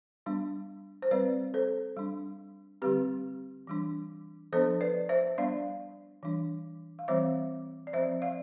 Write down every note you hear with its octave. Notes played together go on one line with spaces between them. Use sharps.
G3 B3 D4
C5
G3 C4 B4 D5
A4 C5
G3 D4
D3 G3 C4 G4 B4
E3 G3 D4
F3 B3 D4 A4 C5
B4 D5
C5 E5
G3 B3 D4 D5 F5
E3 G3 D4
F5
E3 G3 C4 C5 E5
D5
F3 C4 C5 E5
D5 F5